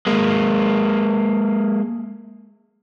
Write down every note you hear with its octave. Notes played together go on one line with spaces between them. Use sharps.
G#3 A#3